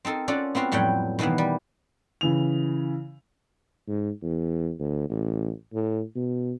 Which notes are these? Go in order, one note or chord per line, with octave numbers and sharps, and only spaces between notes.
C4 D#4 A4 A#4
C#4 F4 A4 D5 F#5
B3 C4 F4 F#4 F5
F2 A2 F#3 G3 F#5 G5
B2 D#3 E3 A#3 B3
G3
C#3 E3 F7
G#2
E2
D2
A1
A2
B2